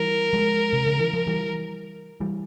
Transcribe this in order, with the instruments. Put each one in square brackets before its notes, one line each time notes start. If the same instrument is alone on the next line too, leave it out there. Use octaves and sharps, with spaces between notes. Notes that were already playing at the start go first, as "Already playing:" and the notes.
Already playing: [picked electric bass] E3 G3 [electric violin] A#4
[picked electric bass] F3 G#3
C3
C#3
E3
F3
E3 G3
E3 G3